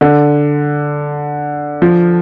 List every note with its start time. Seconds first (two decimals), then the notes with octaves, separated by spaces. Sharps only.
0.01 D3
1.82 F3